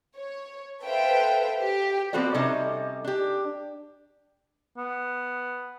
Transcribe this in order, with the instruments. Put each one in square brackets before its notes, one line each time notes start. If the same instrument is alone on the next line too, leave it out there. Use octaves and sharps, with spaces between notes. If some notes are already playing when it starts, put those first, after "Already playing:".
[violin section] C#5
A4 B4 C5 E5 F5 G5
G4
[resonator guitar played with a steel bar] F3 B3 C4 F#4 A4 D5
C3 G3 C#4 D#4 A4 D#5
D4 G4
[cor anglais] B3